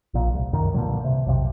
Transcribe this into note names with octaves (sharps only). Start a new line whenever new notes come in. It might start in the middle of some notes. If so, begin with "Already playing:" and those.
A#1 A#2
C2
C2 F#2 D#3
G2 A#2 D3 F#3
C3
B1 F2 C3